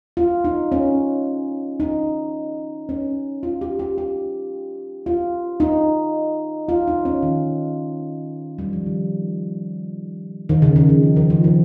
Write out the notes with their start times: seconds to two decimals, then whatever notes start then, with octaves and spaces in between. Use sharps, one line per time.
0.17 F4
0.45 D#4
0.72 C#4
1.80 D#4
2.89 C#4
3.43 F4
3.61 G4
3.79 G4
3.98 G4
5.06 F4
5.60 D#4
6.69 F4
6.87 D#4
7.05 C#4
7.23 D#3
8.59 G3
8.73 F3
8.86 D#3
10.49 D#3
10.62 C#3
10.76 D#3
10.89 F3
11.03 C#3
11.16 D#3
11.30 F3
11.44 D#3